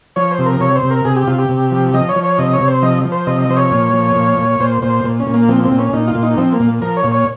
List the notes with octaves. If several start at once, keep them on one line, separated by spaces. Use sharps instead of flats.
F3 C#5
C5
C3
A#4
C3 C#5
C5
C3
A#4
C3 G#4
G4
C3 F4
G4
C3
F3
F3 D#5
C#5
F3
C#5
C3 D#5
C#5
C3
C5
F3 D#5
F3
C5
C3 D#5
D#5
F3 C5
C#5
A#2
F3
A#2
A#2
A#2 C5
A#2 C5
A#2
C#4
A#2
A#3
F3 C4
C4
A#2
C#4
A#2 D#4
F4
A#2
D#4
F3 C4
A#3
A#2
F3 A#4
C#5
A#2
C#5